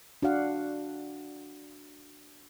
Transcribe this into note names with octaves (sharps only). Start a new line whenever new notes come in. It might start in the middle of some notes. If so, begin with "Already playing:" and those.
D4 F#4 D5 F5 F#5